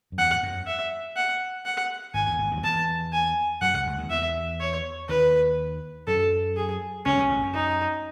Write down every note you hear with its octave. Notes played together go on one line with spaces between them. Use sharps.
F#2
E2 F#5
G#2
F#2
E5
F#5
F#5
G#1 G#2 G#5
E2
G#1 G#2
D#2 D#3
F#3
E2 E3 A5
G#5
F#2 F#3 F#5
C#2 C#3
C#2 C#3
D#2 D#3
E2 E3 E5
C#5
D#2 D#3 B4
F#2 F#3 A4
G#4
C#2 C#3 C#4
B1 B2
A1 A2
F#2
D#4